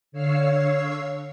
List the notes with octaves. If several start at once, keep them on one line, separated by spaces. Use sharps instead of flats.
D3 C#5 F5 E6 C7